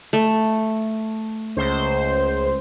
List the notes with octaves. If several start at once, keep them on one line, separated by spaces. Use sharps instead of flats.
A3
C#2 C5